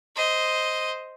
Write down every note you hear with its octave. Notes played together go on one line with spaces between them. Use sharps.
C5 D#5